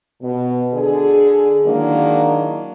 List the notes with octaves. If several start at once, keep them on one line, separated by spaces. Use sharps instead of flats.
B2
D3 G#4
D#3 F#3 G#3 A#3 D4 E4